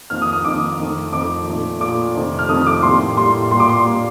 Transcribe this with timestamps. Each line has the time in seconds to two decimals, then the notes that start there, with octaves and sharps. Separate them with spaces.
0.10 F2 D#3 A#3 F6
0.22 D#6
0.33 D#6
0.45 F2 D#3 A#3 D6
0.78 F2 D#3 A3
1.13 F2 D#3 A3 D6
1.47 A#2 A3
1.81 A#2 A3 D6
2.15 F2 C3 D#3 A3
2.39 F6
2.49 F2 C3 D#3 A3 D#6
2.67 D6
2.83 A2 G3 A#3 C6
3.17 A2 G3 A#3 C6
3.51 A#2 G3 A#3 C6
3.60 D6
3.69 C6
3.85 A#2 G3 A#3